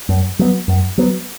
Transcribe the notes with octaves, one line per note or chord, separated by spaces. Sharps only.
F#2
F#3 B3
F#2
F#3 B3